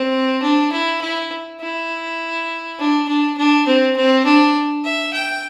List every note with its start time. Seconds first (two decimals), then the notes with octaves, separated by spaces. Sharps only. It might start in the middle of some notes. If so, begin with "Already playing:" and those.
Already playing: C4
0.42 D4
0.72 E4
1.01 E4
1.60 E4
2.79 D4
3.08 D4
3.37 D4
3.67 C4
3.96 C4
4.25 D4
4.84 E5
5.13 G5